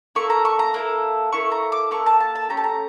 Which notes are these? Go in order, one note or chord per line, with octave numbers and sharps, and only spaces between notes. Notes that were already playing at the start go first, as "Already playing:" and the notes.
A#3 E4 A4 C#6
A#5
C#6
A#5
A#3 E4 A4
A#3 E4 A4 C#6
A#5
D6
A#3 E4 A4 C#6
A5
A5
A5
A3 C#4 G4 A#5
A5
A#5